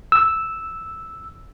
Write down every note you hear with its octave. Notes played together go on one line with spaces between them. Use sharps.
E6